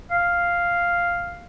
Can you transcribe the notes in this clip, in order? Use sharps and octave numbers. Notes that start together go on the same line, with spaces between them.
F5